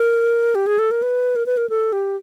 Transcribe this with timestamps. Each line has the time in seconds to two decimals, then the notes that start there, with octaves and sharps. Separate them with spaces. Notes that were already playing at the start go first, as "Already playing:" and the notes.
Already playing: A#4
0.55 G4
0.67 G#4
0.79 A4
0.91 A#4
1.02 B4
1.36 A#4
1.46 B4
1.57 A#4
1.70 A4
1.93 G4